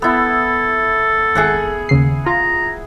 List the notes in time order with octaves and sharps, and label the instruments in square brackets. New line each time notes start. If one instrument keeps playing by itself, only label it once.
[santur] B3 E4 [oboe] A4
[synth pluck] G#1 [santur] G#4 E5 F#5
[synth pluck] D#2 C#3 C7
[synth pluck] F4 [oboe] A#5